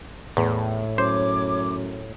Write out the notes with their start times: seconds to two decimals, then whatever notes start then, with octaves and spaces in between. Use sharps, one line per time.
0.37 E2 A2
0.98 F#2 C5 C#5 D6